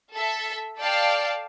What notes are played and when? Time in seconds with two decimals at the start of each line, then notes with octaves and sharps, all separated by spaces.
0.13 A4 E5
0.78 A4 D5 F5 G5 A5